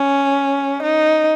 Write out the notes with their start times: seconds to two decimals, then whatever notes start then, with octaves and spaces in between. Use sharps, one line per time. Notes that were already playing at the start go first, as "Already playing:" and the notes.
Already playing: C#4
0.83 D#4